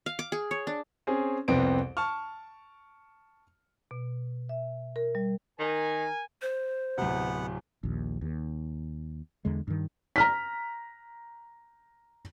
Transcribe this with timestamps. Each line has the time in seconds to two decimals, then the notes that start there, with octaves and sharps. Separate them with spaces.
0.06 F5
0.19 D6
0.32 G#4
0.51 C#5
0.67 D4
1.07 C4 C#4 G#4
1.48 C2 F2 B3 C4 D7
1.97 A5 C#6 F6
3.91 B2
4.49 E5
4.96 A#4
5.15 G3
5.60 D#3 A#4 G#5
6.42 C5
6.98 D1 C3 B3 F#5
7.83 A#1 D#2
8.21 D#2
9.45 E2 D3 G#3
9.67 G2 D#3
10.16 A#5 F6 B6